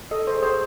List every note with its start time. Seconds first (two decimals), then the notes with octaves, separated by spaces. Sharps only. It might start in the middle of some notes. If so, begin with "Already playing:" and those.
0.11 A4 D#5
0.27 C5
0.33 G#4
0.43 C5